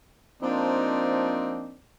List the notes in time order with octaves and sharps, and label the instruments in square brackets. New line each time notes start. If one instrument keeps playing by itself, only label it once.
[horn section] F3 A#3 C4 D4 D#4